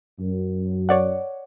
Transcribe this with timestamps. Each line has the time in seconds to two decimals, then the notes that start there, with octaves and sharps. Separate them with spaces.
0.20 F#2
0.89 C#5 D5 F#5